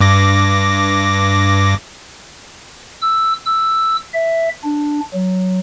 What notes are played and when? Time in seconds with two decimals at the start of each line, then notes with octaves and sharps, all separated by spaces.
0.01 G2 D6 A#6
3.02 E6
3.46 E6
4.13 E5
4.64 D4
5.14 F#3